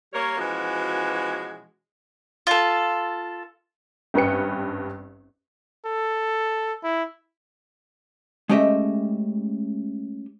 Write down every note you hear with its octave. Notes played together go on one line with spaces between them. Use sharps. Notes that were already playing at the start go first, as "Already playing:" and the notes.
G3 A#3 A#4 C#5
B2 E3 F3 G#3 C#4 F#4
F4 A4
G#1 G2 C#4 B4 G5 C#7
A4
E4
G#3 A3 C#4 G4 D#5 E5